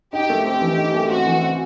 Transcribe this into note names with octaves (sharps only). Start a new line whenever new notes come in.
D#4 G4
A3
C4 G4
E3
D#4
A3
C4 F#4
E3
C4